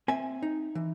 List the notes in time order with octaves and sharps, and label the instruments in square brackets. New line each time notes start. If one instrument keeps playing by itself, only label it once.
[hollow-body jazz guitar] C4 E5 G#5
D#4
E3